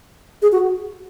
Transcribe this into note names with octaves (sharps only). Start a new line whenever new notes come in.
G#4
F#4